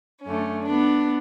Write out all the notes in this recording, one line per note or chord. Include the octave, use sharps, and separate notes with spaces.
F#2 D3 A3 C#4
B3 D4